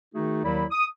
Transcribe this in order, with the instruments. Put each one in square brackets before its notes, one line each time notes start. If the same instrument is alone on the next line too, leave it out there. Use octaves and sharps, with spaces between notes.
[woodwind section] D#3 A3 D#4 F#4 G#4
D#2 D#3 F#3 E4 D5 B5
D#6